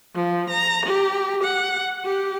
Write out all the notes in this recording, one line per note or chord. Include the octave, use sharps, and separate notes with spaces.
F3
A#5
G4
F#5
G4